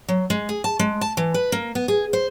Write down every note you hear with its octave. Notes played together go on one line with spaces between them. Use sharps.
F#3
G#3
G#4
A5
G#3
A5
E3
B4
A#3
B3
G#4
C5